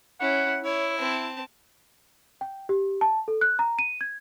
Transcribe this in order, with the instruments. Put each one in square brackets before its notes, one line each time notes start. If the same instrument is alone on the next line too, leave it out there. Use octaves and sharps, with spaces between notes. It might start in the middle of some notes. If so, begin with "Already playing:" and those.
[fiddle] C#4 E4 [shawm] F#5
[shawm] E4 [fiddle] C#5
[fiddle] C4 A5
[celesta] G5
G4
A5
A4
F#6
A#5
D#7
G#6